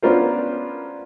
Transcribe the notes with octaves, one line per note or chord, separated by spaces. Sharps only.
B3 C#4 D4 F4 A#4 C5